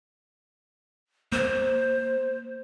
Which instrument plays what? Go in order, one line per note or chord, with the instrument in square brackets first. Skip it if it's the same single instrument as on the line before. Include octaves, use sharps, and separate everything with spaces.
[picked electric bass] A#3 [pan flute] C5